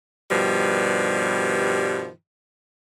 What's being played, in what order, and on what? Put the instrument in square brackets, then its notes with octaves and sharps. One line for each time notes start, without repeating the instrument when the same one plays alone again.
[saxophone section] G2 B2 D#3 F3 G3